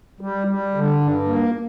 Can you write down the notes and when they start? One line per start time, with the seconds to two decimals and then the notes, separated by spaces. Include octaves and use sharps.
0.21 G3
0.47 G3
0.75 D3
1.02 G2
1.28 A#3